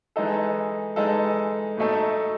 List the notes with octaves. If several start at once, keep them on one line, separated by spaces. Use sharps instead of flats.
E3 G#3 D#4 A4
E3 G#3 D#4 A4
A2 F#3 A3 D#4 A4